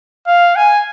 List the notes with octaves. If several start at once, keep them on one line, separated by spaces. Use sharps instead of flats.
F5
G#5